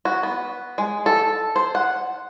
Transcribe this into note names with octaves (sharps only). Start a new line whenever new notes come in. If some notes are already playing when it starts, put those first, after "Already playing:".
F#4
B3
G#3
A4
C5
F#5